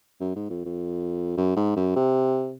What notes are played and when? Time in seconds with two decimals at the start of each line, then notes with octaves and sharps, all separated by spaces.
0.21 F#2
0.36 G#2
0.50 F2
0.65 F2
1.37 F#2
1.56 G#2
1.76 F#2
1.96 C3